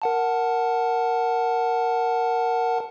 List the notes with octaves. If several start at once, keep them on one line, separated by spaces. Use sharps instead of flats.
A#4 F#5 A5